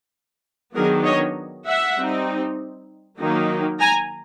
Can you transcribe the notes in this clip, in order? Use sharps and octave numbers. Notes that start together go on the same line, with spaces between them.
D#3 F#3 B3 D4 G#4 A#4
C#5 D#5
E5 F#5
G3 C4 D#4
D#3 F#3 A#3 D#4
G#5 A#5